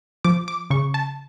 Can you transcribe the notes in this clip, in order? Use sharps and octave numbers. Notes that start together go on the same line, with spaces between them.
F3 D6
D6
C#3 C#6
A5